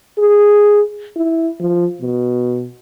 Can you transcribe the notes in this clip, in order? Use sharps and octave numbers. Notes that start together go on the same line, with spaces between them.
G#4
E4
F3
B2